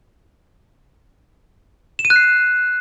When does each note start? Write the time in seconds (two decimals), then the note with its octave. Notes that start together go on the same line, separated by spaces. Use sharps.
1.99 E7
2.05 D#7
2.10 F#6
2.16 C7